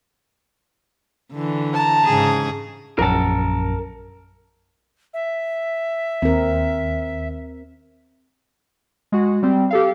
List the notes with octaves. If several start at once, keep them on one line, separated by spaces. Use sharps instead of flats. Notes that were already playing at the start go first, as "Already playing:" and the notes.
D3 E3
A5 A#5
G#2 C#3 G#4
A#1 F#2 A#4 A5
E5
D#2 C4 A#4
G#3 F#4
G3 C4
G4 A4 F5